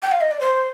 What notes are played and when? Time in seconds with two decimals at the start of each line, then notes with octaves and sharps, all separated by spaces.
0.03 G5
0.12 F5
0.21 D#5
0.31 D5
0.40 C5